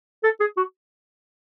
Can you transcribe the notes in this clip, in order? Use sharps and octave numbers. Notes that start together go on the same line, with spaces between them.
A4
G#4
F#4